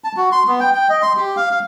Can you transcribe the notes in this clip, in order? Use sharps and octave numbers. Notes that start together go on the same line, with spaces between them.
A5
F#4
C6
B3
G5
G5
D#5
C6
G4
F5
F5